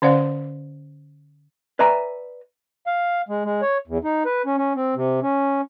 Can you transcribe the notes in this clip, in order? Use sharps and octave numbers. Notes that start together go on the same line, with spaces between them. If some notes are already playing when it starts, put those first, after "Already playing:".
D3 C#4 C5 D5 F5 F#5
B4 D5 E5 G#5 A#5
F5
G#3
G#3
C#5
E2
D#4
B4
C#4
C#4
C4
C3
C#4